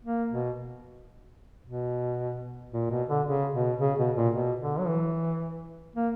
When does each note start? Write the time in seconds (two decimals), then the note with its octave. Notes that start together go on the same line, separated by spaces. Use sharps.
0.05 A#3
0.31 B2
1.66 B2
2.73 A#2
2.91 B2
3.09 D3
3.27 C#3
3.53 B2
3.80 C#3
3.99 B2
4.16 A#2
4.34 B2
4.61 D3
4.79 F#3
4.88 E3
5.96 A#3